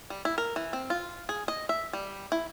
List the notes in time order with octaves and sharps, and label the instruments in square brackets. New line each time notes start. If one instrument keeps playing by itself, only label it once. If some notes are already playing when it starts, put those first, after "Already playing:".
[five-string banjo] G3
E4
A#4
E3
C4
F4
G#4
D#5
E5
G3
E4